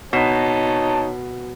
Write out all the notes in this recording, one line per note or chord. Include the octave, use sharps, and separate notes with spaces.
B2 D#4 C#5 A5